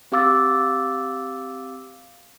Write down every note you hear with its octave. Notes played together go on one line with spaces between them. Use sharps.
C4 G4 F5 D6 E6 A6